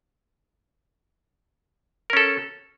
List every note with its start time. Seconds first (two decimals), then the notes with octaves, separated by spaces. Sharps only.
2.10 A#4
2.13 C#4
2.17 A4